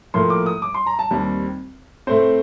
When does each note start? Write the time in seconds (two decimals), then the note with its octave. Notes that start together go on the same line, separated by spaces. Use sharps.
0.14 A2 F3 A#3 C6
0.30 D6
0.46 D#6
0.62 D6
0.74 C6
0.86 A#5
0.99 A5
1.11 D#2 D#3 G3 C4
2.07 A2 A3 C4 C5